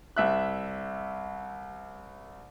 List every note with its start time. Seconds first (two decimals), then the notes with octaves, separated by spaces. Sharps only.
0.16 C2 E5 F#6